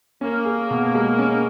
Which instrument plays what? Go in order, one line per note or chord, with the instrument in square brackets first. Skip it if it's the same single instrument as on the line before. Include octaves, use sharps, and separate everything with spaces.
[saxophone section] A#3 [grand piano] C#4
[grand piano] G#4
B2
G#3
C#4